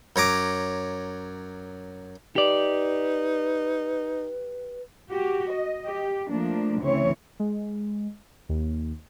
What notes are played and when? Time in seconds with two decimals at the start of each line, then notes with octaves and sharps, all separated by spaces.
0.16 F#2 C#5 A#5 D6
2.36 D#4 G4 B4 D5
5.10 F#4 G4
5.52 D#5
5.85 G4
6.28 F3 A3 A#3 D4
6.80 D2 C#3 E3 C4 C#5
7.40 G#3
8.49 D#2